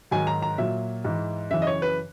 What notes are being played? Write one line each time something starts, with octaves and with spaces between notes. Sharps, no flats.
G#2 D#3 F#3 G#5
A#5
A#5
A#2 F#3 E5
G#2 E3
F#2 C#3 E3 E5
D#5
C#5
B4